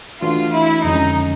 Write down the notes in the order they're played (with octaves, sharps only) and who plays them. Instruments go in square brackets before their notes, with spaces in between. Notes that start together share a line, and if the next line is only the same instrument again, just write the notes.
[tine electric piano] E3 A3 D4 F#4 [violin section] F4
[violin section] E4
[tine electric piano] F2 D3 F3 G#3 C#4 [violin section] D#4